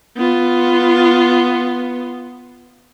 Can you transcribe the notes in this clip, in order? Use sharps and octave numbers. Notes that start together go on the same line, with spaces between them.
B3 F4